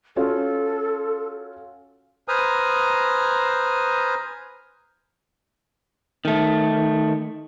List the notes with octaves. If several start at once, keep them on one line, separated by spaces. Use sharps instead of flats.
C#4 F4 F#4 A4
B4 C5 G#5 A#5 D#6 F6
D#3 A3